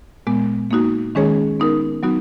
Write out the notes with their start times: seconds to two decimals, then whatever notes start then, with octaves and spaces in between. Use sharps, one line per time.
0.27 A#2 G#3 B3
0.71 A#3 D#4 F#4
1.15 D#3 G#3 C#4 G#4 C#5
1.60 B3 D#4 A#4
2.03 F#3 B3 D#4 F#4